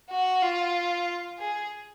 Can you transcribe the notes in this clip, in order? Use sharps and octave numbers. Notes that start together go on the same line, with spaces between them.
F#4
F4
G#4